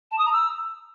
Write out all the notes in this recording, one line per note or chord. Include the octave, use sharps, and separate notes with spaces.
A5
D#6
A#5
E6